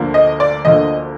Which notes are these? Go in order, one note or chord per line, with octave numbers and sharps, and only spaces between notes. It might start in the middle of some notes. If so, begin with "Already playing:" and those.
Already playing: D2 D3 F3 A#3
D#5
D5
D2 D3 F3 A#3 D#5